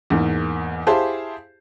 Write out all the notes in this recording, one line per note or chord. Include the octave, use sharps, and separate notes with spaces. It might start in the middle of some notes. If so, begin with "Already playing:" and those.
E2 G#2 A#3
E4 G4 G#4 C5 F5 A5